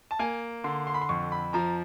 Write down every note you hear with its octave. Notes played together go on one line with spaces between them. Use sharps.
A5
A#3 G#5
D3 C6
C6
B5
C6
F2 C#6
B5
F3 A#5